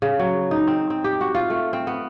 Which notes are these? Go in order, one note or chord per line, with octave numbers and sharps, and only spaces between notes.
C#3
F#3
D#4
C4
C4
G4
F#4
F4
A3
C4
B3